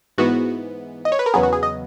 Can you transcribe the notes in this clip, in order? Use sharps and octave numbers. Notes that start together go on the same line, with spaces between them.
G#2 E3 B3 F#4
D#5
C#5
B4
A#4
E2 C#3 F#3 B3 G#4
F#4
G#4
D#5